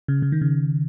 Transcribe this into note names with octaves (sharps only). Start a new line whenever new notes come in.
C#3
C#3
D#3
C#3